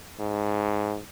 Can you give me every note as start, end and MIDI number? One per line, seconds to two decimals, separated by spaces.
0.20 0.99 44